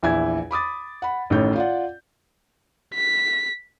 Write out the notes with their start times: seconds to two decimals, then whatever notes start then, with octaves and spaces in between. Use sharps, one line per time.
0.03 A#1 E2 E4 G#5 G#6
0.51 B5 D6 D#6 A6
1.02 F#5 B5
1.30 A1 A2 D#3 C#4 C#5 G6
1.56 F4 D5 F#5
2.95 B6